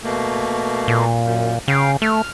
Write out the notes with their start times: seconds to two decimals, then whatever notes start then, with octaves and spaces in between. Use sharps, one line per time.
0.04 B2 A3 A#3
0.88 A#2
1.24 F#2
1.68 C#3 F5 G5
2.02 A3 F6